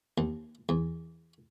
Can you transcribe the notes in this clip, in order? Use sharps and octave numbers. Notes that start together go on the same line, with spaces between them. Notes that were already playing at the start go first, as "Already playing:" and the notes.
D#2
E2